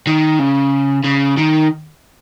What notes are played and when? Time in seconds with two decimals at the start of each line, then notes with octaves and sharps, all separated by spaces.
0.07 D#3
0.39 C#3
1.05 C#3
1.38 D#3